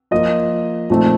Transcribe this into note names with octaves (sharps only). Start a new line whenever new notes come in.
F3 A#3 F4 D#5
A#2 F3 A3 C4 D#4